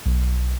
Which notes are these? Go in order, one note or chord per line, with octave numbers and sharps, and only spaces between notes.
B1